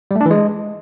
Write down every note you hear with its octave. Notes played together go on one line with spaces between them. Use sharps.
G3
A3
D4
E3
G#3